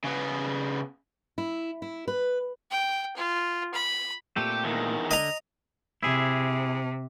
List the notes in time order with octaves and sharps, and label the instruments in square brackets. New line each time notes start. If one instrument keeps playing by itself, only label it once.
[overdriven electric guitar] C#3 B3
[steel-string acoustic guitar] E4
E4
B4
[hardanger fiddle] G5
F4
B5
[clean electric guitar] A#2 A3 C4 [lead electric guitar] G4
[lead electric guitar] E2 D#3
[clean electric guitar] D3 [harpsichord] D#5 A#5
[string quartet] C3 [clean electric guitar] E4 G#4